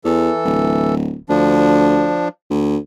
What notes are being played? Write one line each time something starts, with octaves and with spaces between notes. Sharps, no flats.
E2 E3 A4
D1
D2 F3 D4
D2